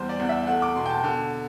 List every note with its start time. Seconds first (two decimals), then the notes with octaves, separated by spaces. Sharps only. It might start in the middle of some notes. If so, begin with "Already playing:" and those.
Already playing: E2 G3 C5
0.09 D5
0.20 E2 F#5
0.29 E5
0.47 A3 F#5
0.62 D6
0.76 B2 C6
0.86 G5
0.90 A5
1.04 D3